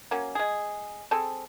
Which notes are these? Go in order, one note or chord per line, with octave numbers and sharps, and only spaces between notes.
F#3 A#3 C#4
G#3 G#4
C4 G#4 A4